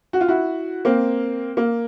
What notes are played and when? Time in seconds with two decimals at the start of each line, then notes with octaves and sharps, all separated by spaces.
0.13 F#4
0.21 F4
0.28 E4 F#4
0.85 A#3 C4
1.57 A#3